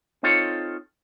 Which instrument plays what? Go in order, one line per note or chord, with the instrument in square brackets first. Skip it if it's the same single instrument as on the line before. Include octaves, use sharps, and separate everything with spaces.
[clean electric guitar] C4 D#4 F4 A4 C#5